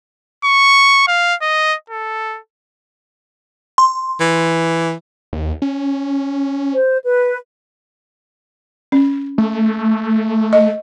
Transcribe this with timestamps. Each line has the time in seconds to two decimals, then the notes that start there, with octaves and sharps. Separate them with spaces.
0.45 C#6
1.08 F5
1.42 D#5
1.90 A4
3.78 C6
4.20 E3
5.33 D#2
5.62 C#4
6.73 C5
7.04 B4
8.92 C#4
9.38 A3
10.53 D#5